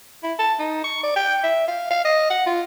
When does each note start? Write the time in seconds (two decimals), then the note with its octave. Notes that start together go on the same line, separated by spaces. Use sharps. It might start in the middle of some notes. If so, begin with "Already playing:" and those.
0.24 E4
0.39 A5
0.59 D#4
0.84 C#6
1.03 D5
1.16 G5
1.44 E5
1.68 F5
1.91 F5
2.05 D#5
2.30 F#5
2.46 F4